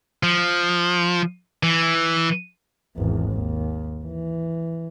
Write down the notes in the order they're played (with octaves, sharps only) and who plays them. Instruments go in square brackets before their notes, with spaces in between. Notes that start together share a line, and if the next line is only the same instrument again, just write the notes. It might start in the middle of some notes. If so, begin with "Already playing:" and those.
[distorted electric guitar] F3
E3
[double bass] G#1 E2
D#2
E3